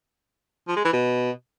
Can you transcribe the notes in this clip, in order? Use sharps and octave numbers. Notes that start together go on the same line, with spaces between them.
F3
G#3
E3
B2